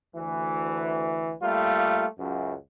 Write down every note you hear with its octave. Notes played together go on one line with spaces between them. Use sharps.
D2 E3
G3 A3 A#3 F4
C#2 F#2